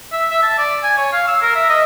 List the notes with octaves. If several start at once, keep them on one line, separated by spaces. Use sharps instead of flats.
E5
E5
A5
D5
G#5
C#5
F5
E6
A#4
E5
D#5